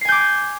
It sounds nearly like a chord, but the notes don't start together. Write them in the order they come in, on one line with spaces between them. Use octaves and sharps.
C7 G#5 G6 D6